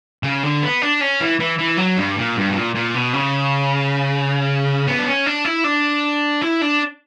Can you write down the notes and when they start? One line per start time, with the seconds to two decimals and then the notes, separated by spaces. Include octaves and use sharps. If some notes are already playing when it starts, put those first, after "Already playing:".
0.23 C#3
0.43 D3
0.63 B3
0.82 D4
1.01 C#4
1.21 E3
1.40 E3
1.59 E3
1.78 F#3
1.97 G2
2.17 A#2
2.36 G2
2.50 B2
2.56 A#2
2.74 A#2
2.95 B2
3.13 C#3
4.87 B3
4.98 D4
5.06 C#4
5.26 D4
5.45 E4
5.64 D4
6.42 E4
6.61 D4